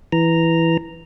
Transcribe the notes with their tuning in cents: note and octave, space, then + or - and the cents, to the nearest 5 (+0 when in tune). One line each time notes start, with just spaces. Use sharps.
E3 +0 A#5 -5